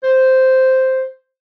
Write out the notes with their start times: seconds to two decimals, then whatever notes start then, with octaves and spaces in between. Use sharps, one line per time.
0.03 C5